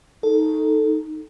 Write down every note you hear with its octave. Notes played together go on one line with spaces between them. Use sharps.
D#4 A4